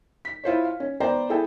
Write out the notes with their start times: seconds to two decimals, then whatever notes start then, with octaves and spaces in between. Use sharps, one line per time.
0.25 B6
0.44 E4 F4 C5 C#5
0.65 F5
0.80 C#4
1.00 B3 C5 D5 G5 A#5
1.29 E4 G#4 A4 E5 G5